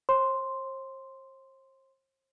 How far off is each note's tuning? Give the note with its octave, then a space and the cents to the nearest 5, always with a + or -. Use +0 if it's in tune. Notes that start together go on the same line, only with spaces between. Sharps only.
C5 +40 C6 +0